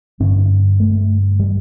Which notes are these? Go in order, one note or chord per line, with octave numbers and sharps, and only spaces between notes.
G2 D3 C#4
A3
G3